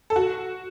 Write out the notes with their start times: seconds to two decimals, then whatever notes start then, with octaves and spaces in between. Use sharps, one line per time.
0.10 A4
0.16 F#4